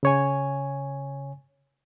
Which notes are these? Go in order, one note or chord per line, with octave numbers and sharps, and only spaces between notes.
C#3 C#5 G#5